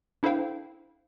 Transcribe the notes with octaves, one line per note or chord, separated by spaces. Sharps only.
D4 E4 A4 C5 F5 G5